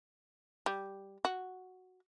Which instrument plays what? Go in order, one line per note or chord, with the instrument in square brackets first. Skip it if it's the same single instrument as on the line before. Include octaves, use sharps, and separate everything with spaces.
[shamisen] G3
F#4